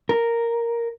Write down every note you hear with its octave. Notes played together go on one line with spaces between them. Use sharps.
A#4